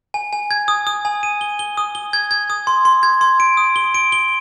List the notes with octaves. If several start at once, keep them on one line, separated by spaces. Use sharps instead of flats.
G#5
G#5
G#6
D#6
D#6
G#5
D#7
G7
G7
D#6
G7
G#6
G#6
D#6
C6
C6
G#6
C6
D7
D#6
G7
D7
G7